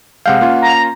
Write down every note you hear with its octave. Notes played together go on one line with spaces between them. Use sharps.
C3 G#3 F5 F#5 G6
A#3 C#4 F4
A#5